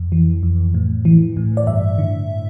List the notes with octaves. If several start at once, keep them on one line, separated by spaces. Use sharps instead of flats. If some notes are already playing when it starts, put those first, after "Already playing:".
Already playing: F2
E3
F2
A2
E3
A2
D5
G2 E5
D3